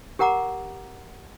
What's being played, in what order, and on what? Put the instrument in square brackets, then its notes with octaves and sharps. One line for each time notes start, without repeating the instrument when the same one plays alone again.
[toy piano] G4 A#4 F#5 A#5 D6